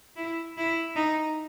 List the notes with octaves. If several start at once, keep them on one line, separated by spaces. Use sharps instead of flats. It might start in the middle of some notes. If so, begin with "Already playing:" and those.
E4
E4
D#4